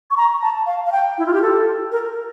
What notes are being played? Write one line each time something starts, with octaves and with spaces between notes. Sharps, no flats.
C#6
A#5
A5
F5
F5
G5
E4
F4
G4
A4
A#4